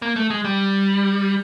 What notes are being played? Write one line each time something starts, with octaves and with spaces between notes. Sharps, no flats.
A#3
A3
G#3
G3